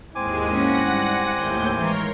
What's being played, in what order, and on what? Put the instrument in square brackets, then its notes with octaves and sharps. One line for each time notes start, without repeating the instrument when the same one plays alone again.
[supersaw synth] D#2 G#3 D#7 [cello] G#2 E4 [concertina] C4 G#5 D6
[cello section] A#3 C#4 [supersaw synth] F#5 A#6
[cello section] G3
[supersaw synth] D#2 A2 G6
[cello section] E3 A#3 [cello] G#3 [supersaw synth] A#4 C#5 C6